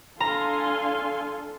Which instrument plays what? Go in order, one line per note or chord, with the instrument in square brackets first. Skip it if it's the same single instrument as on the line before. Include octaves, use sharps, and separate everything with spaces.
[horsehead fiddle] D4 A4 [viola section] F5 G#5 C6 [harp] A#5